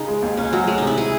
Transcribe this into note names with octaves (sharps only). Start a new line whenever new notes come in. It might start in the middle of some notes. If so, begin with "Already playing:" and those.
Already playing: C#3 D#4
G#3
D#2
C#2 C#4
C#2 F#3
G#3 A3
C3 D#4
E4
G#4